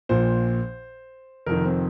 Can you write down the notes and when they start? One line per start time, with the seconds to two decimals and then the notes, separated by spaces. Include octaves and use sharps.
0.09 A#1 A#2 C5
1.46 F1 F2 D#3 A#4
1.64 C4